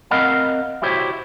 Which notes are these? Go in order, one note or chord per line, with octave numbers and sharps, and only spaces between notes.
C4 A#4 D#5 F5 F#5 B5
E4 F#4 G4 C5 C#5